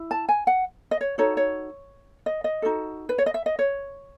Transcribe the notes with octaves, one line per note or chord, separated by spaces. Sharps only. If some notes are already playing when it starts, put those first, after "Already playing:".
Already playing: E4
A5
G#5
F#5
D#5
C#5
D#4 F#4 A4 C#5
C#5
D#5
D#5
D#4 F#4 A4
B4
C#5
D#5
E5
D#5
C#5